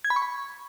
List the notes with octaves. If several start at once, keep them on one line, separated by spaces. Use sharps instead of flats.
G#6
B5
C#6
B5